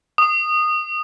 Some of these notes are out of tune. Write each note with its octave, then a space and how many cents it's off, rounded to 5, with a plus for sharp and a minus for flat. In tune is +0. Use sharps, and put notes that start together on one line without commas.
D#6 -20